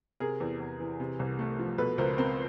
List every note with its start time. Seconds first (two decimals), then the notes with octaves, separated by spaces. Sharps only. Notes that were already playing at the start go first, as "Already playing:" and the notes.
0.20 C3 G#4 A#4
0.40 E2
0.60 E2
0.80 E3
1.00 C3
1.19 C2
1.39 A3
1.59 F3
1.78 B2 A4 B4
1.98 C#2 A#4 C5
2.18 C4 A#4 C5